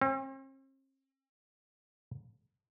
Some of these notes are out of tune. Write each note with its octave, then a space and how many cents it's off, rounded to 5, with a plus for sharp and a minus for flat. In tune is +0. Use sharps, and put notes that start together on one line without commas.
C4 +45